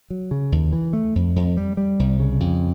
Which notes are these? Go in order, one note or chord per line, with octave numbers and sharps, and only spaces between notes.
F#3
C#3
D#2
E3
A3
F2
F2
G3
G3
C2
C#3
F2